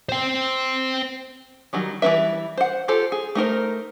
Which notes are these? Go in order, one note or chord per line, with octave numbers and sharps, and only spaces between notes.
C5 G5
D#3 F#3 G3
E3 G3 D4 B4 E5
C5 F#5
F4 G4 A4 C5
G#4
A3 D#4 A#4 C5